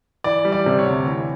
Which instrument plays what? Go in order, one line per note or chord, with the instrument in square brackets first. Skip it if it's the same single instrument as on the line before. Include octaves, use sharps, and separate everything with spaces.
[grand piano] E3 D5
G3
D5
C3
C#5
D2
E3